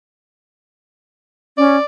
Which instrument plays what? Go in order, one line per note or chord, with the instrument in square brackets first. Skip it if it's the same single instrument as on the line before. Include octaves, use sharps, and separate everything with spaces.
[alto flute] C#4 [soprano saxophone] D5